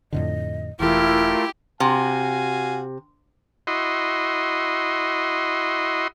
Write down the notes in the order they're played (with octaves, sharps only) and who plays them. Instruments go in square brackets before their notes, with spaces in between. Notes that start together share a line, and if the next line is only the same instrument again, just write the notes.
[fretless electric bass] F2 A2 D3 [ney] D#5
[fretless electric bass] E1 E3 [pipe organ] A3 F4 A#4 [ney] E4 [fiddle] G4
[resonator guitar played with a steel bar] C3 [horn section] F#4 F5 G#5
[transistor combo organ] E4 F#4 D#5 C6